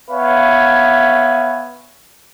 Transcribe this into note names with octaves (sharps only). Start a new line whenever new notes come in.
B3 B4 C#5 E5 F5 G#5